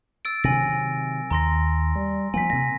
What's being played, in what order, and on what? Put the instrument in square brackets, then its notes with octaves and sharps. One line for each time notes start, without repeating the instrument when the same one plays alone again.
[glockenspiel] E6 A6 D7
[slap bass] C3 D#3 F#3 [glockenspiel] G#5 A#6
[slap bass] D#2 [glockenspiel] A#5 C6 A#6
[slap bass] G3
[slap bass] F3 A#3 [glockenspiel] G#5 B6
[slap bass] C3 A#3 [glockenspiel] A#6